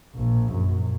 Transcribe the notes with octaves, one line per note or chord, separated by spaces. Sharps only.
A#1
F#2